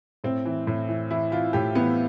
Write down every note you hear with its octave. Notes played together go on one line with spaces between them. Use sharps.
A2 C4
E3
A2
E3
E3 E4
E3 F4
A2 G4
E3 B3